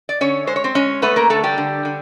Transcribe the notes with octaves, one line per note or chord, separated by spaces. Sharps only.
D5
D3 C#4 C#5
G#3 C5
C#5
C4 C5
G#3 C#4 C#5
A3 B3 B4
A#3 A#4
D3 A3 A4
G3 G4
D3
D3